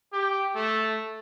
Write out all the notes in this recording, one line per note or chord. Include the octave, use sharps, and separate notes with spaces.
G4
A3